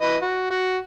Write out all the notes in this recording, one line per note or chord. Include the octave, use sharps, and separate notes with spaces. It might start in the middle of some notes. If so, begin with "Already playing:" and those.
E3 B4 D#5
F#4
F#4